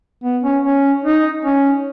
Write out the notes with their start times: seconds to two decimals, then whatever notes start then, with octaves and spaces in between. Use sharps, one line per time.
0.24 B3
0.43 C#4
0.64 C#4
1.04 D#4
1.45 C#4